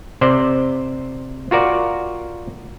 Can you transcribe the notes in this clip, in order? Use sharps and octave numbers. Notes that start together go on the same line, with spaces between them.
C3 C5 D5
F4 F#4 A#4 D5